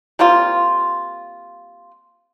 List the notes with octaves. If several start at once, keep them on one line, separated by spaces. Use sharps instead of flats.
G3 A#3 C4 F4